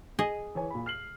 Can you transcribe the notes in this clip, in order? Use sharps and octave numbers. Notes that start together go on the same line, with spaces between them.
G#4 D#5
E3 C#5 G#5
A#2 B5
F6 C7 F#7